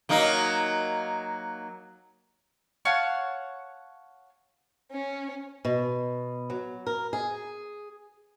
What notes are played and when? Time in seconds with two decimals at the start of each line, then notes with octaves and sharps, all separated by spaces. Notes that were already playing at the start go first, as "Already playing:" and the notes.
0.09 F#3 A#3 D#4
2.85 C#5 F5 F#5 A5
4.92 C#4
5.65 B2
6.50 F#3
6.87 A#4
7.13 G#4